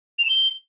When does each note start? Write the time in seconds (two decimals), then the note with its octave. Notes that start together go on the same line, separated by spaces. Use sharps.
0.19 F7
0.24 E7
0.29 G7